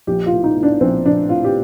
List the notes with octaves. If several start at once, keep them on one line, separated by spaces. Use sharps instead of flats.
A#1 G4
F4
A2
D#4
A2
D4
A#1 C4
A#1 D4
A2 F4
G4